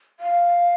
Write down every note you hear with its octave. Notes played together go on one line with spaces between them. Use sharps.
F5